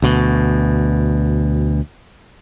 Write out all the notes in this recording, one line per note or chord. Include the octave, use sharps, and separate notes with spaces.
D2 B2